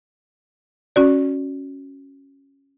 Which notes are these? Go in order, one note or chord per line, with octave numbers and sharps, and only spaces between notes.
C#4 F#4 D5